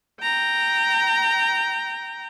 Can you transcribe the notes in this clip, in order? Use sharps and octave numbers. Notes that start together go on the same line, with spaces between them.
G5 A#5